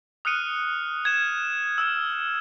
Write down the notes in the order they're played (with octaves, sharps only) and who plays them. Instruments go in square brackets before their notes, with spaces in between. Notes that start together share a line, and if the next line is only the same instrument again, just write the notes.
[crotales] D#6 F6 F#6 C#7 D#7
G#6 E7
E6 F6 E7